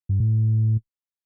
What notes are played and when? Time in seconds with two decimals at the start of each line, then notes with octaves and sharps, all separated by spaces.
0.09 G2
0.20 A2